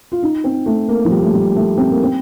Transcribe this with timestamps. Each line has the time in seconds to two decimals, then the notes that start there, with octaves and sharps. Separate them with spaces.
0.12 F4
0.23 D#4
0.44 C4
0.66 A3
0.88 A#3
1.05 F3
1.11 G3
1.23 A3
1.33 G3
1.56 A3
1.77 C4
1.90 A#3
2.03 C4